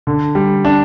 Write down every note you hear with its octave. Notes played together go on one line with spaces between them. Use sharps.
D3
G3
D4